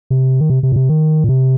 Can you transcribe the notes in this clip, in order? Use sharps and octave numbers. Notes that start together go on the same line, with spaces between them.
C3
D#3
C3
C3
A#2
C3
D#3
A#2
C3